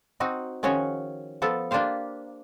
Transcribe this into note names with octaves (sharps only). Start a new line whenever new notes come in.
C4 D#4 F#4
D#3 F3 C#4 F#4 G#4 C#5
F3 B3 A4
A#3 D4 F4 G4 C5 F5